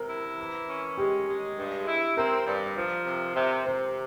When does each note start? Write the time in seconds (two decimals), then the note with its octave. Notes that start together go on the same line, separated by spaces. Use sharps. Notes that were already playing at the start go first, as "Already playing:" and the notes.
Already playing: C3 A#4
0.09 E4
0.39 E3
0.68 C#4
0.98 G#3 G4
1.28 G#3
1.57 G2
1.87 E4
2.17 C4 A#4
2.47 G2
2.76 F3
3.06 C3
3.36 C3 C5
3.65 C3 C5